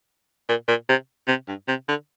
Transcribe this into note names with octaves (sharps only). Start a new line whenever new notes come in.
A#2
A#2
C3
C3
G2
C3
D3